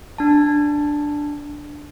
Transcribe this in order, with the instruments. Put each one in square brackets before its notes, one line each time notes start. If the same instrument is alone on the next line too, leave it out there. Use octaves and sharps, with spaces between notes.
[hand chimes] D4 A5